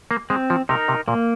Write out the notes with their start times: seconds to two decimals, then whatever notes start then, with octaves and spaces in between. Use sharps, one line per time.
0.11 A#3
0.30 G#3 C4
0.50 F3
0.69 C3 D#4 A#4
0.88 C3
1.08 A#2 A#3